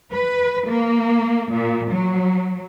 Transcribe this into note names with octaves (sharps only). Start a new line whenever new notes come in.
B4
A#3
A#2
F#3